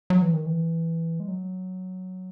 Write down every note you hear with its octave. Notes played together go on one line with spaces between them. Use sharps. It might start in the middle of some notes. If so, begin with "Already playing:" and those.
F#3
E3
D#3
E3
G#3
F#3